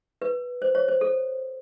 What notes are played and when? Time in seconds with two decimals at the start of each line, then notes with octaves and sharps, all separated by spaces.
0.22 B4
0.62 C5
0.75 C#5
0.88 C5
1.01 A4